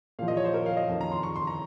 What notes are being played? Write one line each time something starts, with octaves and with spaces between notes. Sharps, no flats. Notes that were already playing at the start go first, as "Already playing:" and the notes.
A#2 F3 F5
D#5
C#5
C5
A#4
F5
D#5
F2 D#3
A#5
C6
C#6
C6
A#5